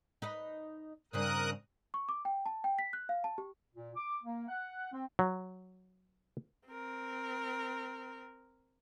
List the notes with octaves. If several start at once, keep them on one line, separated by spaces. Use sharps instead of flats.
D#4 B4 D#5
G2 C#3 C4 A#4 D#6 F#6
C#6
D6
G5
A5
G5
B6
F#6
F5
A5
G4
A#2
D6
A#3
F#5
C4
F#3
C4 A#4